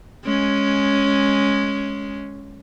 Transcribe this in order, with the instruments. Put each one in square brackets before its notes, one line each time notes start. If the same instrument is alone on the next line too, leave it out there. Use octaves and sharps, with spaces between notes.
[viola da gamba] G#3 C#4